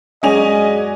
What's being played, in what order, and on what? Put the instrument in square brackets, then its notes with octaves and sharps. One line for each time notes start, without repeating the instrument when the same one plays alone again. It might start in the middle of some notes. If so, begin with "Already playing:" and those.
[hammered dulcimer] F#2 F#4 D5 [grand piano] G#3 [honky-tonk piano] C#4 G#5 F7 [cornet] D#5